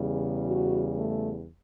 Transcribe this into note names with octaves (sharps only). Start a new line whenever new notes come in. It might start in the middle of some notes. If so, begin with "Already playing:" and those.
Already playing: E2 C#3 G3
F#4
A3